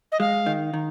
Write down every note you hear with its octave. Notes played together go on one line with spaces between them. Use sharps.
D#5
G#3 F5
D#3
D#3